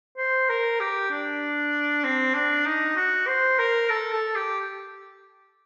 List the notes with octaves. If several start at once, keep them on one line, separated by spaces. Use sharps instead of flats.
C5
A#4
G4
D4
C4
D4
D#4
F#4
C5
A#4
A4
A4
G4